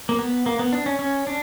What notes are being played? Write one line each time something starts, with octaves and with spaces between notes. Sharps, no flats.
A#3
B3
A#3
B3
D4
C#4
C#4
D4